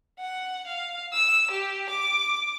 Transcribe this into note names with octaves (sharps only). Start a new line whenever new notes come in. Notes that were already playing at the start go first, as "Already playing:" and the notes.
F#5
F5
E6
G4
D6